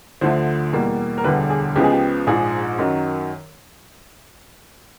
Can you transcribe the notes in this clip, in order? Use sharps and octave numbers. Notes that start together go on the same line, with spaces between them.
D2 D3 F3 A3 C5
E2 B2 G3 A#3
A#4
E1 D2 D3 G3 B4
G#4
C#2 C#3 F3 G#3 B3 G4
G#4
G4
A#1 G#2 F3 G#4
F#2 D#3 F#3